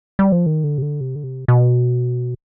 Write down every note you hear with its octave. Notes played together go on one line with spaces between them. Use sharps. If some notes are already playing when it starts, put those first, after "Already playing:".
G3
F3
D#3
D3
C3
D3
C3
D3
C3
B2